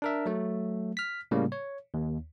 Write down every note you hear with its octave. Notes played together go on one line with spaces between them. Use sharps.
D4 A#4 E5
F#3 A3
F6 B6
A2 C#3 G3 A#3
C#5
D#2